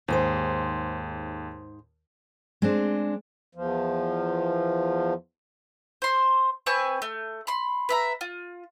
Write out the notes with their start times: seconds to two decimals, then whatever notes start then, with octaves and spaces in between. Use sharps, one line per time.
0.08 D#2 G#2 G#4 C5
2.62 G#3 C4 D4
3.55 E2 F3
6.02 C5 C6
6.66 C4 B4 G#5 C#6
7.02 A3
7.47 B5 C6
7.89 B4 E5 A#5
8.21 F4